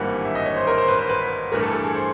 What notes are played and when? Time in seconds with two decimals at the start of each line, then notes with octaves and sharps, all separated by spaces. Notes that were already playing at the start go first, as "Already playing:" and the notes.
Already playing: G#1 G2 E3 G3 A#3 F#5
0.25 E5
0.35 D#5
0.46 C#5
0.57 C5
0.67 A#4
0.78 C5
0.88 B4
0.99 C5
1.10 B4
1.52 G2 E3 A3 A#4
1.62 A4
1.73 A4
1.84 G#4
1.94 C5